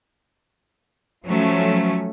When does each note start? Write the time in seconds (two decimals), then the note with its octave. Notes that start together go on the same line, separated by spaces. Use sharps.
1.25 F3 F#3 A3 C#4